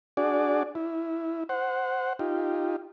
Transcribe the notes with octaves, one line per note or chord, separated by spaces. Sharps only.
D4 F#4 G#4 D5
E4
C5 F#5
D#4 F4 G4